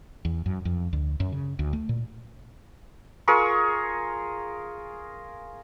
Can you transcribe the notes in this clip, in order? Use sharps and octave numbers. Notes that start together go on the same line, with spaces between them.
E2
F#2
F2
D2
F#2
C#3
D2
A3
A#2
F4 G#4 A#4 C#6